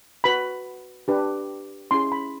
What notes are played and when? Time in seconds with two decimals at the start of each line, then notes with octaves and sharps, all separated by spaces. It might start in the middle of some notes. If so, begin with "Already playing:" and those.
0.24 F#4 B4 B5
1.08 D4 G4 B4
1.91 C#4 E4 G#4 C6
2.12 B5